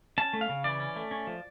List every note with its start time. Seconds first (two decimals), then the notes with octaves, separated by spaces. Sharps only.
0.18 C#4 A5
0.33 A3
0.41 F5
0.49 C#3
0.64 E3 D5
0.80 C#4
0.96 A3
1.11 C#4
1.27 F3